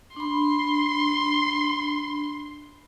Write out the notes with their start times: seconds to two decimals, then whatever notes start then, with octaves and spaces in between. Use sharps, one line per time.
0.16 D4 B5 C6